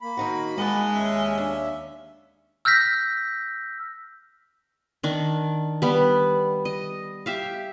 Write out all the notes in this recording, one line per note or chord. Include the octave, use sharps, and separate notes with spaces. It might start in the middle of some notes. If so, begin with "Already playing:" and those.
A#3 B5
D#3 D#4 F#4
G#3 D#5 F#5 A5
D#2 C#4 E5
D4
E6 F6 G6 A#6 B6
D#3 D4
G3 B3
D#5
G4 E5 F5